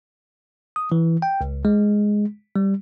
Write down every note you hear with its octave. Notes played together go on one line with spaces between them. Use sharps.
D#6
E3
G5
C#2
G#3
G3